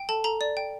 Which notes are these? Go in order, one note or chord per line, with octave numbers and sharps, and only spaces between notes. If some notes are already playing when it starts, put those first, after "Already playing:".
Already playing: G5
A4 A5
A4 A#5
D5
G5